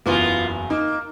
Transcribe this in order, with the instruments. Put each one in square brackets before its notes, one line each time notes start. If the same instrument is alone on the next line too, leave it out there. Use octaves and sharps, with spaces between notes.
[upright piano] F#1 E2 [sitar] A#3 B3 F4
[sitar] A#3 [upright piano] D#4